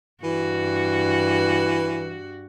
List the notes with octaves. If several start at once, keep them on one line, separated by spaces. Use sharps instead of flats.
G2 E3 F#4